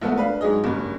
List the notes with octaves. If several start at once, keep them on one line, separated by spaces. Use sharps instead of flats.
A#1 A3 B3 A4 F#5
D4 B4 F5
G#2 F#3 G#4 D#5
F#1 G2